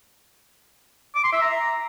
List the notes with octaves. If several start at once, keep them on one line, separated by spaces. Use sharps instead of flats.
D6
C6
E5
A#5